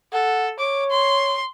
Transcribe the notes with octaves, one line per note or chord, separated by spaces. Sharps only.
A4 F#5
C#5 D6
C6